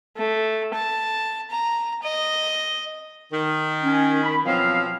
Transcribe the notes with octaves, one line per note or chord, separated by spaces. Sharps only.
A3
A5
A#5
D#5
D#3
C#4
B5
B2 F3 F#3 C4 F5